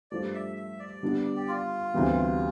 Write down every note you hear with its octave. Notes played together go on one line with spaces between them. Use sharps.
G2 F3 A3 D5
E5
E5
D5
D3 G3 B3 D4
G4
F4
D2 C3 E3 G3 B3